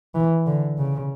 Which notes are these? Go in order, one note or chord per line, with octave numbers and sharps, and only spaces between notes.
E3
D3
C#3